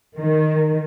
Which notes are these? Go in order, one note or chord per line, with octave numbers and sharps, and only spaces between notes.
D#3